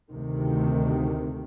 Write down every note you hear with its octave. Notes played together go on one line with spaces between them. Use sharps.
D2 C3 D#3